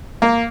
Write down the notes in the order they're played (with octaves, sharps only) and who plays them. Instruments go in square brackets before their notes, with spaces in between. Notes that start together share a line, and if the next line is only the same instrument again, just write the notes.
[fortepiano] A#3